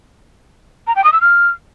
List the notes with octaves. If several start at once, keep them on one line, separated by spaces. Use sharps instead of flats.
A#5
G5
D#6
E6
F6